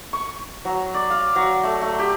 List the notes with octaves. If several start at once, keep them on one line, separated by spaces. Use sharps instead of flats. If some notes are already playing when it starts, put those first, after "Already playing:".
C#6
F#3
D5
F5
F#3
A3
A3
G4